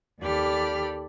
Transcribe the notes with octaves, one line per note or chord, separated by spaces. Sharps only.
D#2 G4 A4 D5 B5 F6